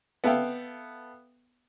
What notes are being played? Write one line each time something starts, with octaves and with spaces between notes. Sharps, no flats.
B3 A4 E5 F5 G5